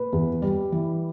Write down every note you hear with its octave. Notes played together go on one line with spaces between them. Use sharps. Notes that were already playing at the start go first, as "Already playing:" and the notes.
Already playing: A#2 B4
E2
G3
E3